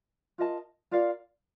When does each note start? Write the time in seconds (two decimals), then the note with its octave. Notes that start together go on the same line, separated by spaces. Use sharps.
0.38 F4 A#4 D#5 A5
0.91 F4 A#4 D5 F5